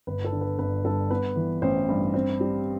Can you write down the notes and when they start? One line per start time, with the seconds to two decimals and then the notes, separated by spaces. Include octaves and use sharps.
0.07 G1 B4
0.24 A4
0.32 D3
0.41 B4
0.58 G1 B4
0.85 G2 A4
1.10 B3 B4
1.36 E3
1.62 A1 C5
1.89 G2
2.14 C4
2.40 G3